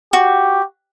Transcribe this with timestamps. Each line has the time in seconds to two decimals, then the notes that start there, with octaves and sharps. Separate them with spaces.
0.13 F#4 G4